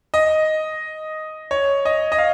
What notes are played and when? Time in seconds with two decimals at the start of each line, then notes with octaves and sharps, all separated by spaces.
0.14 D#5
1.51 C#5
1.85 D#5
2.12 D#5
2.18 F5